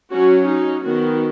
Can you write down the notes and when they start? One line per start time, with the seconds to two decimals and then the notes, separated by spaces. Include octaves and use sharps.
0.11 F#3 C#4 F#4
0.48 D#4
0.84 D#3 B3 F#4